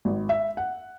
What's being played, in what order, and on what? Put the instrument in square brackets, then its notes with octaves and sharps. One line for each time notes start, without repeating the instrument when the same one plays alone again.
[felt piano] G#1
E5
F#5